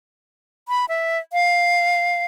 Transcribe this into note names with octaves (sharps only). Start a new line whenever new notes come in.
B5
E5
F5